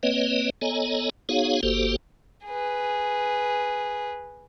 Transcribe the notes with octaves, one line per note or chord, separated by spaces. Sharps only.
A#3 C4 B4 C#5 D#5
B3 A4 C#5 D#5 G#5 A#5
B3 D#4 F#4 G#4 C#5 F5
G1 A#3 F#4 G4 A4 C5
G#4 B4